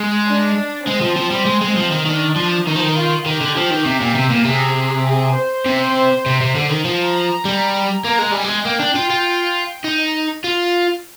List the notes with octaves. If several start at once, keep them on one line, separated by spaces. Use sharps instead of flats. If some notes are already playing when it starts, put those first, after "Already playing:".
Already playing: G#3
D4
G#3 C4
F3
F3
G3
G#3
G#3
F3
D#3
D#3 D4
F3
D#3 D#4
F3
D#3
F4
D#3 G4
D3
F3
D#3
C3
A#2
C3
A#2
C3 G#4
G#4
C5
C3
C3
C3
D3
D#3
F3 A#5
G3
A#3 A#5
G#3
G3 G#5
G#3
A#3 G5
D4
F4
F4
D#4
F4